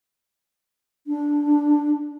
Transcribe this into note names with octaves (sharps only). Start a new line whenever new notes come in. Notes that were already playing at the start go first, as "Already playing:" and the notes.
D4